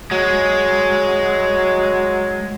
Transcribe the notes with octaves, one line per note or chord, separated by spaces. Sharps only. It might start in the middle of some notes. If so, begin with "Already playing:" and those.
F#3 G#3